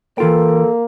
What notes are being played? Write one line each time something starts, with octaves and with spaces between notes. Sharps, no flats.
E3 A#3 F4 A4 G5